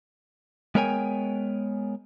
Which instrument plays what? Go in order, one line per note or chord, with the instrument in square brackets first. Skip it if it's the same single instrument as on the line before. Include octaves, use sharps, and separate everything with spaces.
[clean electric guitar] G#3 B3 A#4 C#5 G5 G#5